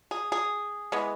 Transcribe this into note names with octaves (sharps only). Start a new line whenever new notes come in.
G#4
G#4
E3 G#3 B3